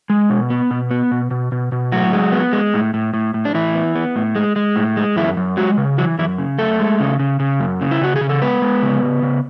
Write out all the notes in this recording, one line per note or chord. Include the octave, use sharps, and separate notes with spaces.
G#3
B2
B3
B2
B3
B2
B2
B2
B2
A2 F#3 F#4
G#3
B3
G#3
A2
A2
A2
A2
D4
A2 E3 E4
B3
B3
A2
G#3
G#3
A2
G#3
F#2 E3 E4
F#2
F#3 G#3 F#4
C#3
E3 F#3 F#4
F#2 E3 E4
C#3
F#2 A3 A4
G#3
C#3
C#3
C#3
F#2
C#3
E4
C#3 F#4
G#4
C#3
A4
G#3 B3 B4
G#3
C#3
C#3
C#3